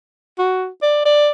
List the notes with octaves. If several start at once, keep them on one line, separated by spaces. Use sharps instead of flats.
F#4
D5
D5